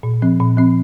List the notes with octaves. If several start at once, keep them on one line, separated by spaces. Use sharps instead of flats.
A#2
F3 C4
A#2
F3 C4